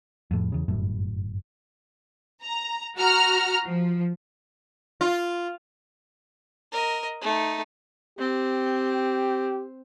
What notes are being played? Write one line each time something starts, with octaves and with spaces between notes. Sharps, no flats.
F2 A2
E2 C#3
G1 F#2 A2
A#5
F#4 A#5 F6
F3
F4
A#4 D#5
A3 D#4
C4 G4